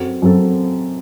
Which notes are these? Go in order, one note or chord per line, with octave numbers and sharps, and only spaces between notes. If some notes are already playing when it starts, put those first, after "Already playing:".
Already playing: F#2 F#3 C4 F#4 A4
F#2 F#3 C4 F#4 A4